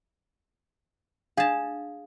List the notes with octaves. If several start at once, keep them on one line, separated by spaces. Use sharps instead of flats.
D4 G#4 F5 A5